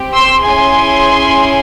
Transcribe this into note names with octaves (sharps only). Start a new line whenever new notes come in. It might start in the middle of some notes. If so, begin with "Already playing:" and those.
Already playing: C4 G4
C6 E6
C#4 E4 G#4 G#5 C6